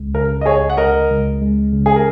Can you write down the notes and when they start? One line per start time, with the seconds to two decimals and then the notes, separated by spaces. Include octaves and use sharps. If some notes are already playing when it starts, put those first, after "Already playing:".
Already playing: C#2 G#3
0.14 C#3 A#4
0.41 D#5
0.45 C#2 G#4 C#5
0.70 F#5
0.77 C#2 A#4 D#5
1.10 C#2
1.42 G#3
1.73 C#3
1.86 G#4
1.96 A#4